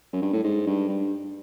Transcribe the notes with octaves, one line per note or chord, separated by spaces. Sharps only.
F#2
G2
A2
G#2
G2
G2